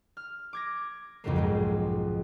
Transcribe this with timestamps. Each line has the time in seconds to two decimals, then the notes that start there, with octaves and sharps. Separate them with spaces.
0.17 F6
0.53 D6 G#6 A#6
1.24 B1 F2 G#2 C#3 A3 A#3
1.36 G#2 G#3